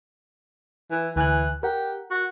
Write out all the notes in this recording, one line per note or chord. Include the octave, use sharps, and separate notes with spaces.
E3
D2 E3 G#5 F#6
G4 A#4 F#5
F#4